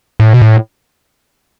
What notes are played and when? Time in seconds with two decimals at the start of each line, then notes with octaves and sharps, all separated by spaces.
0.20 A2
0.33 B2
0.41 A2